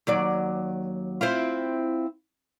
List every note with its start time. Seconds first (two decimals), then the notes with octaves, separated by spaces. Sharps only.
0.07 D#2 F#3 D5
1.21 C4 E4 F4